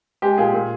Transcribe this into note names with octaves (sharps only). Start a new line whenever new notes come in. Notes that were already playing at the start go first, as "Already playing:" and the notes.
G#3 G4
A#2 G#4
A#2